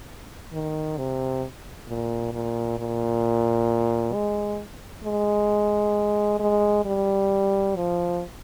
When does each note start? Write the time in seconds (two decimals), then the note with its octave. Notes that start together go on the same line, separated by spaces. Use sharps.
0.53 D#3
0.98 C3
1.88 A#2
2.33 A#2
2.78 A#2
4.14 G#3
5.04 G#3
6.40 G#3
6.85 G3
7.76 F3